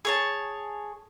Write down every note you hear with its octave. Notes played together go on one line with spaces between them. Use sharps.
G#4 C#5 A5